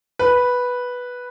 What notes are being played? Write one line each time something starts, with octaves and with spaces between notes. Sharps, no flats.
B4